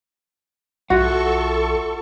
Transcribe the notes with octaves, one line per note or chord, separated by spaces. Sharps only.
B1 F4 F#4 A4 E5 F#5 C#6